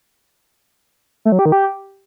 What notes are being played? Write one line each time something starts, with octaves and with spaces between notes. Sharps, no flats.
A3
F#3
G4
D#3
G4